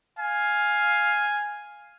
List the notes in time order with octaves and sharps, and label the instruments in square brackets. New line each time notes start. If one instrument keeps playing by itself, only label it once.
[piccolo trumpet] F5 [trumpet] G#5